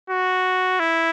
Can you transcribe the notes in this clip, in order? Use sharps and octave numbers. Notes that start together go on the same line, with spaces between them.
F#4
E4